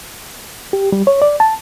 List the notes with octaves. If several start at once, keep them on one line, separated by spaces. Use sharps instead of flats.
G4
G3
C#5
D5
A5